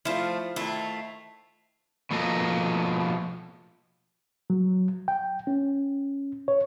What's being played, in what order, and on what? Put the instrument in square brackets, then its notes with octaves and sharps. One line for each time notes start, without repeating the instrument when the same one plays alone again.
[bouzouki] F3 A3 [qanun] E4 F4 [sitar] C5
[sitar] D#3 F4 [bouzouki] A3 [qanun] E4
[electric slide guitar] B2 F3 A#3 A4 D#5
[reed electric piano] F#3
G5
C#4
C#5